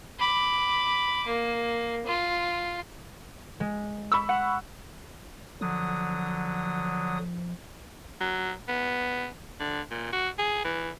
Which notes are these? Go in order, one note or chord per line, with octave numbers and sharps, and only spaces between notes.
B5 D6
A#3
F4
G#3
B5 C#6 E6
F#5
D3 F3 F#3 D#6
F#3
B3
D3
A#2
F#4
G#4
E3